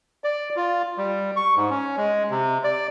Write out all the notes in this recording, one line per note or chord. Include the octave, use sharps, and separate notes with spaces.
D5
F4
G3
C#6
G#2
C#4
G#3
C3
D5